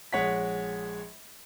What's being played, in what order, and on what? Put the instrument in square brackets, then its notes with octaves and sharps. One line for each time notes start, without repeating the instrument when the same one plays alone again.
[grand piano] A#1 G#3 C#5 F#5 B6